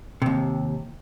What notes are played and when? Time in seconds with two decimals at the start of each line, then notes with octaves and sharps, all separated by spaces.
0.22 D#2 C3